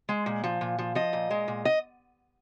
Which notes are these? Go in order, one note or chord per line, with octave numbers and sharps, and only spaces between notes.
G#3
A#2
F3
A#2
F3
F3 D#5
A#2
G#3
A#2
D#5